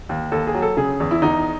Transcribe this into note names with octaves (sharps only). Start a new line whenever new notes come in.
D#2
D#2 A4
G#4
F#3
A4
C#3 G#4
E2
E4
E2 D#4